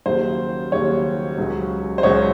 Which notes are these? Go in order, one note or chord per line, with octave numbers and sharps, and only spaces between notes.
D#2 C#3 F#3 C5
D#2 C#3 F#3 C#5
C#2 C#3 F#3
C5
C#2 C#3 F#3 C#5